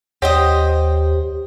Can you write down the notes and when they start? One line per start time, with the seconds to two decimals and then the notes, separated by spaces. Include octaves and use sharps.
0.22 D#2 G4 C5 C#5 D#5 F#5